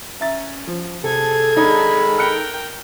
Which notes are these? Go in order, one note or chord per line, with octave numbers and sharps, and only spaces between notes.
C#4 E5 A#5 A6
F3
C3 G#4 A4 G#6
D#3 G#3 D4 D#4 C#5 B5
A#4 G5 F6 F#6 C#7